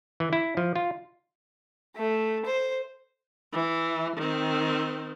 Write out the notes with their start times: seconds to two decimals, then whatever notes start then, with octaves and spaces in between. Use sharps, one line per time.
0.20 E3
0.33 E4
0.57 F3
0.76 F4
1.96 A3
2.45 C5
3.53 E3
4.17 D#3 C4